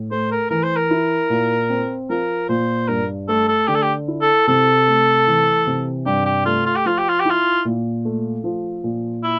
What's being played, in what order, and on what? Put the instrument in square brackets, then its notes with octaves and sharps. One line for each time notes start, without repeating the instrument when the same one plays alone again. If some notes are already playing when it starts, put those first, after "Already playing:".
Already playing: [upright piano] A2
[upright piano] A3 [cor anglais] C5
[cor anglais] A#4
[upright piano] E3 [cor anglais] A#4
[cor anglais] C5
A#4
[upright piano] E4
A#2
C4
[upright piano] F3 [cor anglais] A#4
[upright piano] A#2 [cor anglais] C5
[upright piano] G2 [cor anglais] A#4
[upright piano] A3 [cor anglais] A4
[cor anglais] A4
[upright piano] D3 [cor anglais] G4
[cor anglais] A4
G4
[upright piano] E4
[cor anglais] A4
[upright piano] C3 [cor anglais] A4
[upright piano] A3
E3
C3
[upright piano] G2 [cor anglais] G4
[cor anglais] G4
[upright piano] A3 [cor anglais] F4
[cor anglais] F4
G4
[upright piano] F3 [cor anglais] F4
[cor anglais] G4
F4
G4
[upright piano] E4
[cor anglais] F4
[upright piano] A#2
A3
F3
A#2
[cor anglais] E4